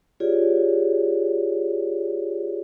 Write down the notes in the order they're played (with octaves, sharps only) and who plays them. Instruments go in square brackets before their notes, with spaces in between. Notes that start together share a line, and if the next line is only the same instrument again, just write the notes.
[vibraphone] F4 G4 G#4 C#5 D5